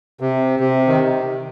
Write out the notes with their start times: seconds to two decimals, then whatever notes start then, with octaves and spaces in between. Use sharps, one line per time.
0.20 C3
0.59 C3
0.87 D#3